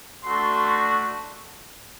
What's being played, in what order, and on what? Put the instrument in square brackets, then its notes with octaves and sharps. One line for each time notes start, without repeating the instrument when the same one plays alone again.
[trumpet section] A3 D4 F#4 C6